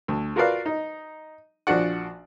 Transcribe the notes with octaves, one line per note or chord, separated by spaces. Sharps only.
D2
F4 F#4 A#4 B4 D5 F5
D#4
A#1 F3 D4 F#4 D5 F#5